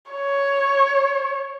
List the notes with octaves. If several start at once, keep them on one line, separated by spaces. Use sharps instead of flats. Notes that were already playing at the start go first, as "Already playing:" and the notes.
C#5